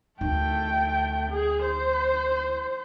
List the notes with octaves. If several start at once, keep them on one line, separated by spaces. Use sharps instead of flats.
D2 D#3 A3 G5
G#4
C5